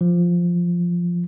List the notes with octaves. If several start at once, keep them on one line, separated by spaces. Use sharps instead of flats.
F3